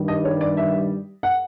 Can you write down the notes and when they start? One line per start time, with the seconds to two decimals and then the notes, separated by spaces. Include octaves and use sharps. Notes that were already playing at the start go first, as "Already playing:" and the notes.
Already playing: G2 D#3 G3
0.08 D#5
0.25 C#5
0.41 D5
0.57 E5
1.23 F#5